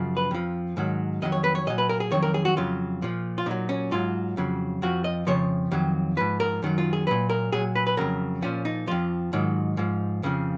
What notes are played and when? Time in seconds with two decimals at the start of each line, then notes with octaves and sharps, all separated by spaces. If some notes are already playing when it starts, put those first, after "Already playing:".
Already playing: F#2 C#3 F3
0.17 B4
0.31 F2 F3
0.77 G#2 D#3 F#3
1.22 F2 D#3 F#3 D#5
1.32 C#5
1.44 B4
1.55 C#5
1.67 A#2 F#3 D#5
1.78 B4
1.89 A#4
2.00 G#4
2.12 F2 D#3 F#3 C#5
2.23 A#4
2.34 G#4
2.45 F#4
2.57 F2 C#3 F#3 F4
3.02 A#2 F3
3.38 F4
3.46 A#2 F#3 D#4
3.69 C#4
3.91 G#2 F#3 F4
4.37 F2 C#3 F#3
4.82 F2 F3 F#4
5.04 D#5
5.27 F2 C#3 F3 C#5
5.72 F2 D#3 F#3
6.17 G#2 F3 B4
6.40 A#4
6.63 F#2 D#3 F#3
6.78 F4
6.93 G#4
7.07 A#2 F#3 B4
7.30 A#4
7.52 A#2 F#3 G#4
7.75 B4
7.87 B4
7.97 F2 C#3 F#3 A#4
8.42 A#2 F3 C#4
8.65 D#4
8.87 F2 F3 F4
9.33 G#2 D#3 F#3
9.77 G#2 F3
10.23 F2 C#3 F3